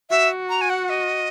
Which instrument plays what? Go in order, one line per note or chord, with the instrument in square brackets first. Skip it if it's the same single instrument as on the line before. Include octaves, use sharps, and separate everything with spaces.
[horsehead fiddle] F#4 [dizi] E5
[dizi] A#5
G#5
F#5
D#5